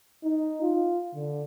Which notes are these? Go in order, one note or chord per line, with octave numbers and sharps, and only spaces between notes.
D#4
F4
D3